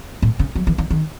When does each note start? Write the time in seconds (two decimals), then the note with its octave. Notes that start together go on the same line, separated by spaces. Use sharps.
0.22 A2
0.39 C#3
0.56 F#3
0.67 E3
0.78 D#3
0.90 D#3